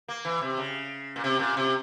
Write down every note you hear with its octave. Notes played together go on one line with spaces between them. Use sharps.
A#3
E3
C3
C#3
A#2
C3
A#2
C3